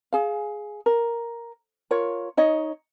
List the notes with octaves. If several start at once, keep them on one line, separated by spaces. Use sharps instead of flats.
G#4 F5
A#4
F4 A#4 C#5
D#4 C#5 D#5